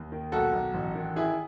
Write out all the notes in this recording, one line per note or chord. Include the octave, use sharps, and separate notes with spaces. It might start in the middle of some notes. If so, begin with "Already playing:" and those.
Already playing: D#2
D#3
B1 F#4 A4
B1
A1
D#3
D#3 E4 G#4